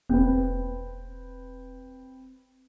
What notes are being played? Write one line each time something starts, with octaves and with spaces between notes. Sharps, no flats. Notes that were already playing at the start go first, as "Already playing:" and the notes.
E1 C4 B4